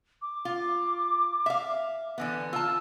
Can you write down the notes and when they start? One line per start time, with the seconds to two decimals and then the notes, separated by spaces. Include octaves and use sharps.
0.22 D6
0.45 F4
1.46 E5 F5
2.18 D3 E3 B3
2.53 F4 A5 E6